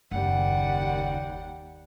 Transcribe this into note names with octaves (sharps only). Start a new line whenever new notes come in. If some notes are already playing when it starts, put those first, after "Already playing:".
F#1 D#2 G3 F#5